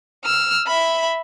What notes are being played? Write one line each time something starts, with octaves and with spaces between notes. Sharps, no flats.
E6 F6
E5 B5